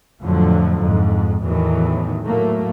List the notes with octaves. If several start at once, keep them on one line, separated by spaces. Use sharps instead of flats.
F2 A2 D3 F3 F#3
F2 G#2
E2 A2 D#3 E3 F#3
A2 F#3 A3 A#3